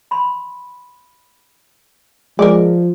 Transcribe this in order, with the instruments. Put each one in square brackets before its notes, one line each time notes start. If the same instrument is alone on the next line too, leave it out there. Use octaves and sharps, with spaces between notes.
[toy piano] B5 C6
[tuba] F3 [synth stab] G#3 [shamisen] A#4 D5